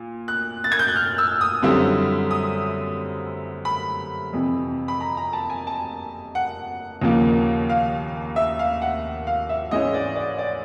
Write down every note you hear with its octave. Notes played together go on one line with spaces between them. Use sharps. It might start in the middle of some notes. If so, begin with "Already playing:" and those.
Already playing: A#2
F#6
A6
G#6
G6
F#6
F6
E6
D#6
F#2 D3 G3 C4 E4
D#6
B5
F2 C3 E3
B5
A#5
A#5
A5
G#5
A5
F#5
D#2 C#3 F3 A#3
F5
E5
F5
F#5
F5
E5
G#2 E3 G#3 C#4 E4 D#5
D5
D5
D5